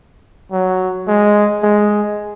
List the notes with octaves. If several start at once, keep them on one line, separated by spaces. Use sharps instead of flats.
F#3
G#3
G#3